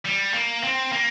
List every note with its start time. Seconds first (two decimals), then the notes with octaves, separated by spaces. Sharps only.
0.05 G3
0.34 A#3
0.63 C4
0.92 A#3